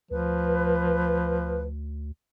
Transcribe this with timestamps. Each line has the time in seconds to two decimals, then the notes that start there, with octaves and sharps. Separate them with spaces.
0.11 D2 F3 B4